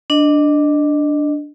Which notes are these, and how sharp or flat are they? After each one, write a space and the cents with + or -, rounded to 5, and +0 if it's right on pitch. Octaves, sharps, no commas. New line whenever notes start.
D4 +0 D#5 -15